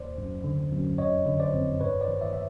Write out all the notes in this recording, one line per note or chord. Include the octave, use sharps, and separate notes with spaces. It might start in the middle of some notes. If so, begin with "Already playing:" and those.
Already playing: D#2 C5 D5
F#2
D3
F#2
F2 C#5 D#5
D3
C5 D5
F2
G2 B4 C#5
C5 D5
D#3
D5 E5
E5